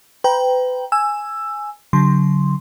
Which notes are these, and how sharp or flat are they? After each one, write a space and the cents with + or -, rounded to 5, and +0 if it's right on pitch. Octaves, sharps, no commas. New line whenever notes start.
B4 +35 G5 +0 A#5 +30
G#5 +0 E6 +10
D3 -40 F#3 +0 C6 +0